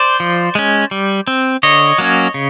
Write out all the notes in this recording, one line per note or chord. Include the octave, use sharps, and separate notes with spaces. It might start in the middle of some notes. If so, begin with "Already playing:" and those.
Already playing: C5 D5
F3
G#3 C#4
G3
C4
D3 C#5 D#5
F#3 A#3 C#4
C#3